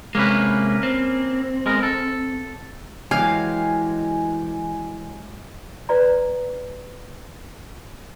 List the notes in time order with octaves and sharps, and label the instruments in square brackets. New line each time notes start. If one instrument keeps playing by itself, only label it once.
[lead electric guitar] C3 G#3 [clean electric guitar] A#3 C#4 B4
[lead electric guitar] C4
[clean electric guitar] G#3 B3 A#4
A4
[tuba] E3 [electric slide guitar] F#3 G#3 G4 [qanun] F5 [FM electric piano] G#5
[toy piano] B4 D5 A#5